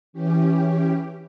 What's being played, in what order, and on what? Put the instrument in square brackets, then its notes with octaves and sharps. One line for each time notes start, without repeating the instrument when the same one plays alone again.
[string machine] E3 C#4 G4